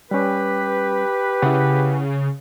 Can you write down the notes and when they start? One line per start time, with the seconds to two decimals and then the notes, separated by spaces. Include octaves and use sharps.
0.11 G3 C#4 G4 B4
1.42 C#3 E4 F#5